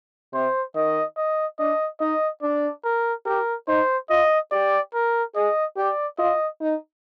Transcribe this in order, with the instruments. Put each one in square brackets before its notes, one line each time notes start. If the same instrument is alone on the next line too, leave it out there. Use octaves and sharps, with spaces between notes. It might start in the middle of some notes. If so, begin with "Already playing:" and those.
[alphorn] C3 [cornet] C5
[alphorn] D#3 [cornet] D#5
[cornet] D#5
[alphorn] D4 [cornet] D#5
[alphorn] D#4 [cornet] D#5
[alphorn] D4 [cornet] D5
[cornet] A#4
[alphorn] G4 [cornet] A#4
[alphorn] D#4 [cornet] C5
[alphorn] F4 [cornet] D#5
[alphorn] G4 [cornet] D5
[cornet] A#4
[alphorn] G#4 [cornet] D#5
[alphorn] G4 [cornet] D5
[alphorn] F4 [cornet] D#5
[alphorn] D#4